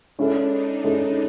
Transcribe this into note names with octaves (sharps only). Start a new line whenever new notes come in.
G#3 C#4 D4 E4 A4
D#4
G#3 C#4 E4 A4